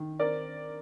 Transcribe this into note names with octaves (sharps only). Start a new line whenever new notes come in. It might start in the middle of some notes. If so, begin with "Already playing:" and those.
Already playing: D#3
C4 A#4 D5